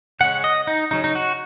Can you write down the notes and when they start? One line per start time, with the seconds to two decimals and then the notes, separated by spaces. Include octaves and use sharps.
0.20 C#3 G#3 C#4 F#5
0.44 D#5
0.67 D#4
0.91 C#3 F#3 C#4 D#4
1.04 D#4
1.15 F#4